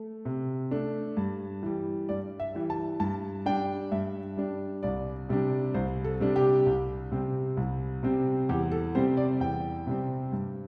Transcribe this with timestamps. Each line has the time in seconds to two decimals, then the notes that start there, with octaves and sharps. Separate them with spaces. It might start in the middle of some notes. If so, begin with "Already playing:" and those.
Already playing: A3
0.25 C3
0.71 A3 D4
1.17 G2
1.63 E3 G3
2.09 G2 D5
2.40 E5
2.54 E3 G3
2.70 A5
3.00 G2 A5
3.46 G3 D4 G5
3.91 G2 E5
4.37 G3 D4
4.83 C2 D5
5.29 C3 G3 D4
5.74 C2 C5
6.04 A4
6.20 C3 G3 D4
6.36 G4
6.66 C2
7.11 C3 G3 C4
7.57 C2
8.03 C3 G3 C4
8.49 E2 G4
8.72 A4
8.95 C3 G3 C4 C5
9.17 D5
9.40 E2 G5
9.87 C3 G3 C4
10.32 G2